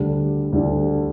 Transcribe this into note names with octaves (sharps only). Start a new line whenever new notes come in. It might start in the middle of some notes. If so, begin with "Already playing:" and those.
Already playing: D2 D3 G3 D4 A4
D2 D3 G3 D4 A4